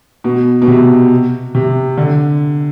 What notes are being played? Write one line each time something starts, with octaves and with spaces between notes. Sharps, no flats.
B2
B2
C3
C3
D3